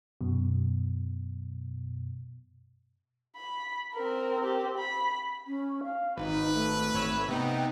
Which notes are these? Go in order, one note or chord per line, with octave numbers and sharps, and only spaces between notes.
F#2 B2
B5
C4 A#4
C4 G4
B5
C#4
F5
G#1 D#4 B4
A3
G#1 C#5 E6
C3 B3 D#4 G5